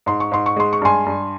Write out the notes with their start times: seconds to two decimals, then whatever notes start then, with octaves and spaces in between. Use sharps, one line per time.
0.06 G#2 C6
0.20 C#6
0.32 G#2 C6
0.46 C#6
0.56 G#3 C6
0.73 C#6
0.82 G2 G#5 C6
1.06 G2